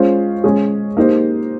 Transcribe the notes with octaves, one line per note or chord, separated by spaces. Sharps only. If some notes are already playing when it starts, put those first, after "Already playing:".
Already playing: G#3 C#4 F4 C5
G#3 C#4 G#4
A#3 D#4 G4 C5